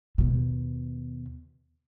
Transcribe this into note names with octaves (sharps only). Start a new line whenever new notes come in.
D#2 B2